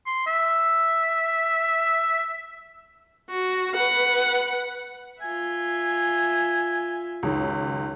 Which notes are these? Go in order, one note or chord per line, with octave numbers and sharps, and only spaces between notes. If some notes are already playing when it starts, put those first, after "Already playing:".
C6
E5
F#4
B4 F#5
F4 E5 G#5
C#2 F#2 D#3